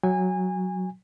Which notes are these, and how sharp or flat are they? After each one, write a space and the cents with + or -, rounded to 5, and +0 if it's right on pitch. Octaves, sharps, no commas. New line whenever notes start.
F#3 +0 G#5 -25